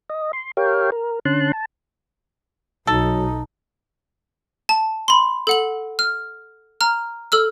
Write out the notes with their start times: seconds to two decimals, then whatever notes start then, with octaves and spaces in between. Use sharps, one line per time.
0.10 D#5
0.33 C6
0.57 G4 A#4 C#5 F5 G5
0.92 A#4
1.25 D3 C#4 A5 C6 F#6
1.53 A5
2.87 B1 F#3 D#4 A4
4.69 A5
5.08 B5 C6
5.47 A4 F#5 F#7
5.99 F6
6.81 A#5 F6
7.32 A4 E6 F6